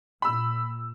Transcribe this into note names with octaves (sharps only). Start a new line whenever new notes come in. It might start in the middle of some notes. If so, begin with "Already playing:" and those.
A#2 B5 E6